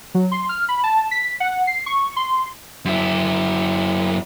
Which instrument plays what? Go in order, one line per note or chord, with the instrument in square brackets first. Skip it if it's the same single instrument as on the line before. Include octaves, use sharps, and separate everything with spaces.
[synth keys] F#3
C6
F6
B5
A5
B6
F#5
C7
C#6
C6
[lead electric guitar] F#2 E4